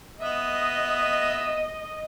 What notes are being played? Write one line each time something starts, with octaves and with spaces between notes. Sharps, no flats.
B3 D#5 E5